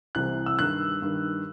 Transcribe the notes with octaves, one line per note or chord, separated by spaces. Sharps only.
C2 C3 E3 F#6
E6
G2 D#3 F#6
G2 D#3